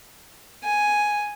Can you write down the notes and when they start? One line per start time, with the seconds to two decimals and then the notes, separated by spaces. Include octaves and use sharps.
0.64 G#5